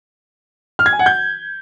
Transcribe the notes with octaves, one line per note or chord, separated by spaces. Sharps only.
F6
G#6
G#5
F#5
G6